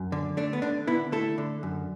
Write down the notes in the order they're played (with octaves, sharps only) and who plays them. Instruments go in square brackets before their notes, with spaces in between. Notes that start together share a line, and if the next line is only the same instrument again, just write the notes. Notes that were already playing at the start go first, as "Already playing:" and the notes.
Already playing: [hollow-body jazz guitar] F#2
D3
A3 D4
B3
D3 D4
D3 B3 E4
A3 E4 A4
D3
F#2